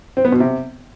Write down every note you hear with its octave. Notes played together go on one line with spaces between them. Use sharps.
C4
B3
B2
C3